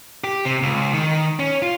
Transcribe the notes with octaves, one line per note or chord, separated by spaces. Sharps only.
G4
C3
C#2
D#3
C#4
F4